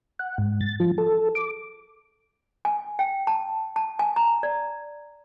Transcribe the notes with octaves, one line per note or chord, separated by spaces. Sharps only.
F#5
G#2
A6
F3
A4
D6
G#5
G5
A5
A5
G#5
A#5
D5